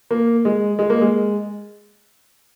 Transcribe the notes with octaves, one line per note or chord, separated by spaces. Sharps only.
A#3
G#3
G#3
A#3
G#3